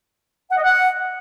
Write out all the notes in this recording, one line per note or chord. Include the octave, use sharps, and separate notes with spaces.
F#5
D#5
F#5